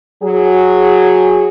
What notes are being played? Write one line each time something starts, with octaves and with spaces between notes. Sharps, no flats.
F#3 G#4